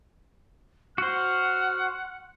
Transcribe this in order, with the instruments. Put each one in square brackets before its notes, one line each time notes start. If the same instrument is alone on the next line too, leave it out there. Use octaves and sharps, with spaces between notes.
[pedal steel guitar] F#4 C5 [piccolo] F#5 [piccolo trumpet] F6